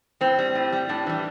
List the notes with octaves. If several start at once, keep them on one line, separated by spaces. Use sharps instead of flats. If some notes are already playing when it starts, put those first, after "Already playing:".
A2 C4
G3
A2
G3
A2 D4
E3 G3